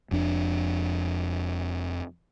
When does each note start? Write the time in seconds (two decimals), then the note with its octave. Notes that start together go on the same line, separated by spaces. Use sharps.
0.11 F1 F2 D4